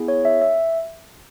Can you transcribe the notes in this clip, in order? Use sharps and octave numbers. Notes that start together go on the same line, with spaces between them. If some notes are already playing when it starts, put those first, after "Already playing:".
Already playing: B3 E4 G#4
C#5
E5
E5